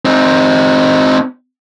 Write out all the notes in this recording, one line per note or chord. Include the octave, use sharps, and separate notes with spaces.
C4 D#4